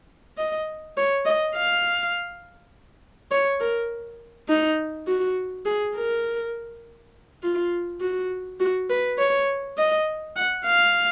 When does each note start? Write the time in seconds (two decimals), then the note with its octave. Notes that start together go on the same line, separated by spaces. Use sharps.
0.38 D#5
0.97 C#5
1.25 D#5
1.56 F5
3.31 C#5
3.60 A#4
4.49 D#4
5.07 F#4
5.66 G#4
5.96 A#4
7.43 F4
8.01 F#4
8.60 F#4
8.90 B4
9.18 C#5
9.78 D#5
10.36 F#5
10.65 F5